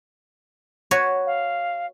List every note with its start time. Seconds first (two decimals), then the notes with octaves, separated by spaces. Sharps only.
0.91 F#4 B4 C#5
1.26 F5